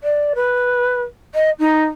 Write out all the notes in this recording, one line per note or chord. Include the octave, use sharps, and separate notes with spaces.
D5
B4
D#5
D#4